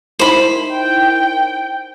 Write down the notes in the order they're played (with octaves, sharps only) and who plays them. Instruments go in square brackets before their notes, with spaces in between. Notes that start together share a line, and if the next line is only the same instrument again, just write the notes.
[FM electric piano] D#4 E4 A#4 [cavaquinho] C5 B5
[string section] G5